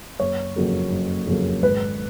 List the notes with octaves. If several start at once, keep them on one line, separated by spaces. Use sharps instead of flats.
F#1 C#5
F2 C#3 F#3 A#3
F#1
F2 C#3 F#3 A#3
G#1 B4